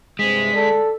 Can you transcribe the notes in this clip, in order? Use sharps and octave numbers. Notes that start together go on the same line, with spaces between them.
G2 C3 G#3 B6
A4 D5